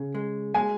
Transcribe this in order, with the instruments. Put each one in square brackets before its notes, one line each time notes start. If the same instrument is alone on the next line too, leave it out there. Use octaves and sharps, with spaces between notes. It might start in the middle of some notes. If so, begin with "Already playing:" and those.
Already playing: [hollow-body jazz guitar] C#3
G#3
[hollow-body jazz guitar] G#3 [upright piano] G#5